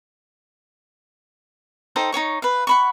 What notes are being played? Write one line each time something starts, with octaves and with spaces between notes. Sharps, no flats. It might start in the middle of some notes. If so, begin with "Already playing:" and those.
D#4 A4 C5 G5
D#4 F#4 C#5 C#6
B4 F5
F#5 B5 C#6